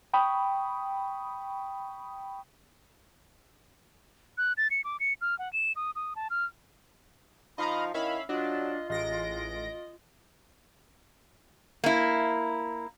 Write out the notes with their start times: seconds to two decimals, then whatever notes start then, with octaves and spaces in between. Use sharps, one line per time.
0.13 G5 B5 C#6 D#6
4.38 F#6
4.57 A6
4.71 C#7
4.84 D6
5.00 C#7
5.21 F6
5.39 F#5
5.53 E7
5.76 D#6
5.96 D#6
6.16 A5
6.30 F6
7.58 F3 D#4 D#5 F5 A#5 B5
7.94 D#3 C#4 E4 E5 F5 B5
8.29 F#3 D4 F4 D#5
8.90 A1 G#3 D#5 A#6 D7
11.84 A#3 E4